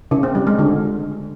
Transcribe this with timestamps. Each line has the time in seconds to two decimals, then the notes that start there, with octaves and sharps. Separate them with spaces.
0.11 C#3
0.23 C4
0.35 G3
0.47 G#3
0.59 D3